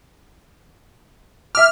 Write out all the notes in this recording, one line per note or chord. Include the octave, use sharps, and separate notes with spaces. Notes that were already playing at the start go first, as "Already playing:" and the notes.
E5 D6 F6